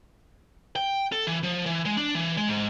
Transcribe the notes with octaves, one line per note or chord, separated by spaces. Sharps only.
G5
A4
E3
F3
E3
G#3
D4
E3
G#3
G#2